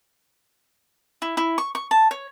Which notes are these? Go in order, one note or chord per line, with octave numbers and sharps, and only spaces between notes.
E4
E4
C#6
C#6
A5
C#5